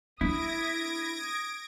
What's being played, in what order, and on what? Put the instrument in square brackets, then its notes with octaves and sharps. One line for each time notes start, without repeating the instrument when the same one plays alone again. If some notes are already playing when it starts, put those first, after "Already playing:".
[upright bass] D4 [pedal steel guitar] E4 [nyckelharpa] D#6 [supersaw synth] G#6 A#6 D7